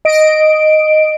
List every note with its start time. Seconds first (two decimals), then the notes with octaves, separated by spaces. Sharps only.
0.05 D#5 D7